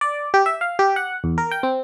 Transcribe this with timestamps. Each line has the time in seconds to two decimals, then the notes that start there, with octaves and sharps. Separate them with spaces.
0.01 D5
0.34 G4
0.46 E5
0.61 F5
0.79 G4
0.96 F#5
1.24 E2
1.38 A#4
1.51 G5
1.63 C4